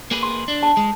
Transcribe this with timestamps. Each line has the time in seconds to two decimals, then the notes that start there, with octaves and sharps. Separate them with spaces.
0.11 A#3 G#4 B4
0.23 C6
0.48 D4
0.63 A5
0.77 G#3